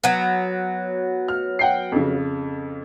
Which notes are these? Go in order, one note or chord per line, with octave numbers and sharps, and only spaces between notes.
F#3 B3
F6
F#5 G5 C7
F2 C#3